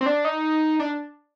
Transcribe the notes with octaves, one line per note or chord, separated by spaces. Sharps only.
C4
D4
D#4
D4